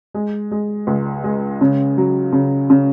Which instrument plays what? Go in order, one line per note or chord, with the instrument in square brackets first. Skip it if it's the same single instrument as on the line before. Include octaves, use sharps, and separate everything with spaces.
[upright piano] G#3
G#3
C#2
G#3
C#3
F#3
C#3
C#3